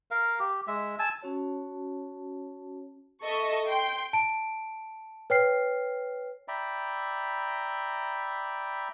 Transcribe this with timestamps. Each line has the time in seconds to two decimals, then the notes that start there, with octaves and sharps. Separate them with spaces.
0.11 A#4 F5
0.39 G4
0.67 G#3 E5
0.99 G#5 A5 E6
1.21 C#4 F#4 C#5 A5
3.22 A4 D#5 E5 C#6
3.65 G5 C6
4.13 A5 D7
5.30 B4 C#5 G5 F6 C7
6.48 D5 E5 G5 A#5 B5